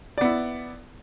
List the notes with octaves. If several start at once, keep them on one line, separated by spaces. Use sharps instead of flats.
B3 E4 D5